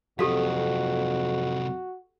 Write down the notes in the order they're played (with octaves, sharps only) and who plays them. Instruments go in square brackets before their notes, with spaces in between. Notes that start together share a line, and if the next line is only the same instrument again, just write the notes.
[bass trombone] F2 [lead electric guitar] C3 F#3 [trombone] F#4 [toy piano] G4 A4 F5